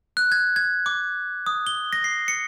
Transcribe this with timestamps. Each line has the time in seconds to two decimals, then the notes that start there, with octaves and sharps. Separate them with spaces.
0.17 F#6
0.32 G#6
0.56 G#6
0.86 D6
1.46 D#6
1.67 G7
1.93 A#6
2.04 C7
2.28 C#7